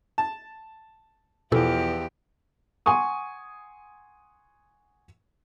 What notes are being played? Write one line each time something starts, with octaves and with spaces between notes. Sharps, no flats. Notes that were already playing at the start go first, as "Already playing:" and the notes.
A5
E2 B2 E3 F3 G4 A4
F#5 G#5 C6 C#6 D#6